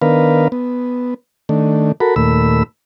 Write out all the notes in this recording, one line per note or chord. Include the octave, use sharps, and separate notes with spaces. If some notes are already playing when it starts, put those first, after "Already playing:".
D#3 B3 D4 A#4 B4 F5
B3
D#3 A3 D4
F#4 A4 A#4 B5
D#2 A#2 A3 B5 E6